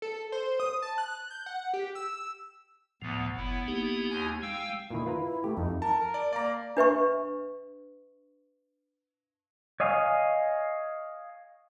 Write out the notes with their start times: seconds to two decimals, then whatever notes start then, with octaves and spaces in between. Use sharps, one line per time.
0.02 A4
0.32 C5
0.60 D#6
0.82 A5
0.98 F#6
1.30 G6
1.46 F#5
1.73 G4
1.95 E6
3.02 D2 A2 F3 B3
3.37 F#1 B3 E4
3.68 A#3 D#4 G4
4.10 D#2 G#5 G#6
4.42 G#3 F5 G5 E6
4.90 A#2 D#3 E4
5.06 F4 B4 A#5
5.44 A3 G4
5.57 F2 D#4
5.82 A#4 A5
6.00 A#4
6.14 D5
6.33 A#3 D5 A#5
6.77 D4 B4 E5 C#6
9.80 C#5 D#5 F5 G#5 C#6